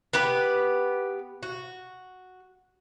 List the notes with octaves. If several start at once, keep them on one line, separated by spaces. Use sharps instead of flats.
B3 G4 B4
F#4